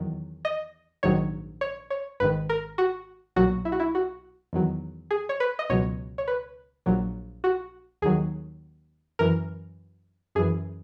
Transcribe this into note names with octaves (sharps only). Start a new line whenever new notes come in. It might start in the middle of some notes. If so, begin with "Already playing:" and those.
Already playing: E2 D#3 F#3
D#5
A#1 G#2 D#3 F#3 C#5
C#5
C#5
G#1 G#2 D#3 B4
A#4
F#4
B1 A#2 F#3 F#4
E4
F#4
E4
F#4
E2 D#3 F#3
G#4
C#5
B4
D#5
C#2 B2 F#3 C#5
C#5
B4
A#1 A#2 F#3
F#4
D#2 D#3 F#3 G#4
F#2 E3 A#4
F#2 E3 G#4